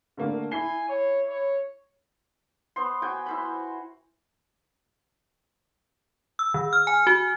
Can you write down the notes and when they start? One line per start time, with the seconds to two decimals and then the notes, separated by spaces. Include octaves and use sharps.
0.17 D3 A3 A#3
0.51 E4 G#5 C7 G7
0.89 C#5
1.28 C#5
2.76 B3 C5 C6
3.02 F#4 G5 G#5
3.26 E4 C5 B5
6.39 E6
6.54 D#3
6.73 F6
6.87 G#5
7.07 F#4